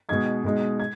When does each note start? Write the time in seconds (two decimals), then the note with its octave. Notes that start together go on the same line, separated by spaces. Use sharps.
0.09 B2 G#3 D#4 G#6
0.45 B2 G#3 D#4
0.80 G#6